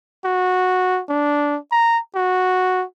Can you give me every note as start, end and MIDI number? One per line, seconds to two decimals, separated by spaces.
0.25 1.01 66
1.09 1.58 62
1.72 1.99 82
2.15 2.84 66